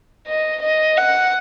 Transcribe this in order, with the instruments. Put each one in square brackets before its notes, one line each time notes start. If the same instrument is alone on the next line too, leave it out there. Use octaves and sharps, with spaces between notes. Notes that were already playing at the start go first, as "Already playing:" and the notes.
[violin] D#5
D#5
F#5